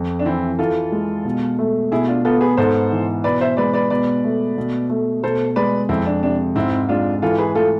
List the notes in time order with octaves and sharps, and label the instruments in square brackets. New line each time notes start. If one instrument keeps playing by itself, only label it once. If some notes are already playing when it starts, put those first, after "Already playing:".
Already playing: [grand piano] F2
[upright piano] D4
[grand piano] E3 [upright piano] C4 E4
[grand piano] E3 [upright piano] F4 A4
[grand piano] G#3
B2
A3
[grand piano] B2 [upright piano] E4 G#4
[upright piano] D4 F4
[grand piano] B3 [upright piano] F4 A4
[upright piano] G#4 B4
[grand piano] G#2 [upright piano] A4 C5
[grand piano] E3
[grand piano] B2 [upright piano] B4 D5
[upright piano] C5 E5
[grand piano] G#3 [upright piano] B4 D5
[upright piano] B4 D5
[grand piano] B2 [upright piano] B4 D5
[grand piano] A3
B2
A3
[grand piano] B2 [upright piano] A4 C5
[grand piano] G#3 [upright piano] B4 D5
[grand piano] F2 [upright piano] C4 E4
[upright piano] D4
[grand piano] C3 [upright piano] D4
[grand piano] G#2 [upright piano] C4 E4
[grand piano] G#3 [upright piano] D4 F4
[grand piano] E3 [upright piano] F4 A4
[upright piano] G#4 B4
[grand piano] A3 [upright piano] F4 A4